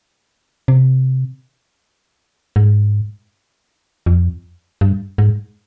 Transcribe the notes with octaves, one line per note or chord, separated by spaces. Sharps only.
C3
G#2
F2
G2
G#2